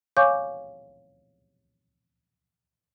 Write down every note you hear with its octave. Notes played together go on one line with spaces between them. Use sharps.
C#5 F5 G#5 C#6 D6 G6